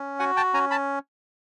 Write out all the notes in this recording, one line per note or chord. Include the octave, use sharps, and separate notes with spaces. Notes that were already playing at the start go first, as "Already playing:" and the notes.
Already playing: C#4
F#4 F#5 G#5
G5 A5
C#4 G#5 A#5
A5 B5